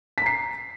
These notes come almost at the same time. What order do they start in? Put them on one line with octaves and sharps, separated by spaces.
B6 A#5 C7